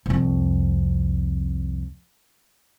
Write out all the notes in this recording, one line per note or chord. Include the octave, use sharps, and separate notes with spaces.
C2 F2